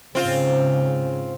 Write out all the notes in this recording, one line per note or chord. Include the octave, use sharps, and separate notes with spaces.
G#2 C#3 C4 F4